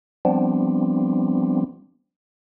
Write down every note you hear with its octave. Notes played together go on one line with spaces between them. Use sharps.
F3 G3 B3 C4 D4